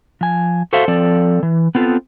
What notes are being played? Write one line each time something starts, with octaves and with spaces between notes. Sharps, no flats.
F3 G#5
F#4 A4 C5 E5 F5
F3 C4 A4 D5
E3
B3 C4 F4 A4